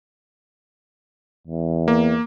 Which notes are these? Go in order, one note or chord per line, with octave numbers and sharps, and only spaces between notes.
E2
A#3